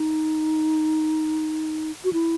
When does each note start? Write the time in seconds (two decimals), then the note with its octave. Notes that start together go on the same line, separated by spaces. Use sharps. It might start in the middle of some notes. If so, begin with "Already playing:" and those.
Already playing: D#4
2.04 F#4
2.13 E4